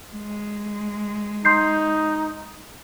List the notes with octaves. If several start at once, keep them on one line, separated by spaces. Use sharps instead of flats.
G#3
D#4 C6 G6 C7